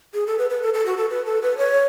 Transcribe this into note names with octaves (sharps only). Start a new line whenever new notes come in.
G#4
A4
B4
B4
A4
A4
F#4
A4
B4
A4
B4
C#5